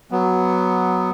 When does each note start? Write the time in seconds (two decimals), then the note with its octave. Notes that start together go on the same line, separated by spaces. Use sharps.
0.11 F#3 B3